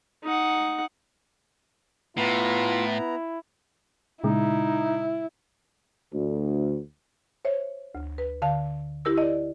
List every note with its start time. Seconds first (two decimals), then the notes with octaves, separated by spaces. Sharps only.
0.24 D#4 F#5
2.17 A2 B3 F4 A#5
2.87 E4
4.24 A#2 C#3 G#3 D#4 E4
6.13 D2
7.45 C5 C#5 E5
7.95 D2
8.18 B4
8.42 D3 F5 A5
9.05 E4 G4 A#4 E6
9.18 D5 D#5